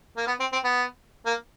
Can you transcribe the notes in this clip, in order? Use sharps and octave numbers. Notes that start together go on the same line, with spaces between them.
A#3
B3
C4
C4
B3
A#3